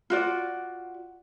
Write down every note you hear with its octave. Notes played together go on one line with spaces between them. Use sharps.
F4 F#4 D5